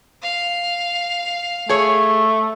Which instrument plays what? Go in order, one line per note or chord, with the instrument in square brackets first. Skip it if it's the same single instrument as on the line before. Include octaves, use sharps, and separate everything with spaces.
[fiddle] F5
[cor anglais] A3 [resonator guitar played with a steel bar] G#4 C#5